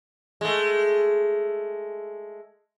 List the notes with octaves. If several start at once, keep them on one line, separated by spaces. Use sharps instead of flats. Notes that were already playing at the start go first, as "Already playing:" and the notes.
G#3 A3